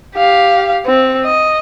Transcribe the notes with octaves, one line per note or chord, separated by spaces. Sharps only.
G4 F5
C4
D#5